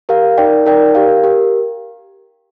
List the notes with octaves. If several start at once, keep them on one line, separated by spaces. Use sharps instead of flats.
G4 A#4 F5
D#4 A#4 D5 G5
D#4 A#4 D5 G5
G4 A#4 F5
G4 A#4